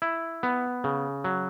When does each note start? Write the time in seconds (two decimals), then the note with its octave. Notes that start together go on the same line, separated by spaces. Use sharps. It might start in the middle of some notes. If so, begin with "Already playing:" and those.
0.02 E4
0.43 B3
0.84 C#3
1.24 F#3